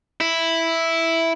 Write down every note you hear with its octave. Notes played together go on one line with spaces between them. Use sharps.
E4